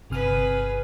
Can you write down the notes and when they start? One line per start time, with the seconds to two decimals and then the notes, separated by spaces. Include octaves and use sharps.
0.10 G1 C3 G#4 B4 F6